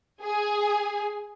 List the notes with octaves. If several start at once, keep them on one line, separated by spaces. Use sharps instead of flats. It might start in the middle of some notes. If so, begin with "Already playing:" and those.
G#4 G#5